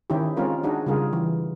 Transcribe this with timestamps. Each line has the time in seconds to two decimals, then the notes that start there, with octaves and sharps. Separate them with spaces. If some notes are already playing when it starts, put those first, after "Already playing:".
0.10 D#3 C#4 D#4 E4 G4
0.37 G#3 C4 C#4 F4 A#4
0.63 D4 D#4 F#4 G#4
0.86 C#3 G3 F4 G#4 A#4
1.13 E3